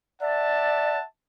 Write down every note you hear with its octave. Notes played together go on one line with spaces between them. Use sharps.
D5 E5 F#5 A5